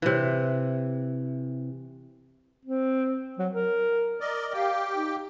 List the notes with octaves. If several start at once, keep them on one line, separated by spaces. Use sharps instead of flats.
C3 E3
C4
F#3
A#4
A#4 D5 D#5
G4 F5 G5
D#4